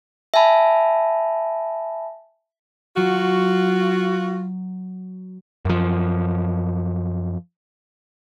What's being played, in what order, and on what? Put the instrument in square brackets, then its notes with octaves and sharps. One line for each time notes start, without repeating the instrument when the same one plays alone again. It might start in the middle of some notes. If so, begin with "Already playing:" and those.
[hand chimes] E5 G#5 A5 B5
[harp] F#3 [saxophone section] F4 F#4
[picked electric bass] F#2 F3